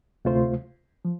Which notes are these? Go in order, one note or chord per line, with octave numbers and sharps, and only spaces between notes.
D2 C3 A3 F4 C5
F3